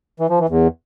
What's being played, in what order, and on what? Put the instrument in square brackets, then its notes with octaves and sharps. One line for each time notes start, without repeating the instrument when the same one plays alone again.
[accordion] E3
F3
E3
E2